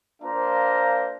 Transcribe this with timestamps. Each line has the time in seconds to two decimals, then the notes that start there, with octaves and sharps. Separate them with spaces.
0.23 A#3 D4 F4 C5 F5 A#5